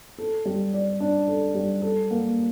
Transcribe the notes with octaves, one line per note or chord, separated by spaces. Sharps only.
A4
G3
D5
D4
A4
G3
A4
A#3